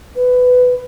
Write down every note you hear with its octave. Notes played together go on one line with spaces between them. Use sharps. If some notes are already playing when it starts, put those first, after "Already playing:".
B4